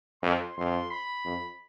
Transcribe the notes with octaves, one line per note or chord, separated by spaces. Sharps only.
F2 C6
F2 C6
B5
F2